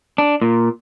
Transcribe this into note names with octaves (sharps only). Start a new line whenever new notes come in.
D4
A#2